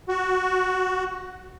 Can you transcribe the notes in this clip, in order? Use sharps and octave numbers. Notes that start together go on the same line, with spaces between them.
F#4